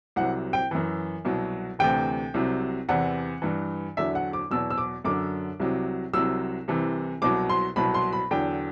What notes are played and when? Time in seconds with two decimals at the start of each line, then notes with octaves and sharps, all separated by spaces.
0.16 C2 C3 F#3 F#5
0.53 G5
0.71 F#2 E3
1.25 C2 B2 F#3
1.79 D2 C3 E3 G5
2.34 C2 C3 F#3
2.89 E2 C3 E3 F#5
3.42 G2 E3
3.97 E2 D3 F#3 E5
4.15 F#5
4.33 D6
4.51 E2 B2 F#3 E6
4.71 E6
4.78 D6
5.04 F#2 D3 F#3 D6
5.60 C2 C3 F#3
6.14 C2 C3 F#3 E6
6.68 C2 C3 E3
7.22 C2 B2 F#3 D6
7.49 C6
7.76 C2 B2 F#3 B5
7.94 C6
8.13 B5
8.31 E2 D3 F#3 G5